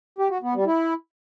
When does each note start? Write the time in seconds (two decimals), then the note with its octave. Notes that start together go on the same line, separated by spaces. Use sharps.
0.18 G4
0.30 F#4
0.42 B3
0.54 G3
0.66 E4